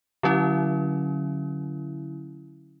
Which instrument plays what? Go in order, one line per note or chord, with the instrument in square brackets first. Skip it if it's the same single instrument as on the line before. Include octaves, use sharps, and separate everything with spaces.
[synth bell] D3 F#3 C#4 E4